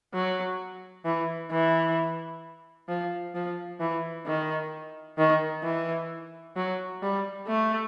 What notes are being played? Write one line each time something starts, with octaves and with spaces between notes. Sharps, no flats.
F#3
E3
E3
F3
F3
E3
D#3
D#3
E3
F#3
G3
A3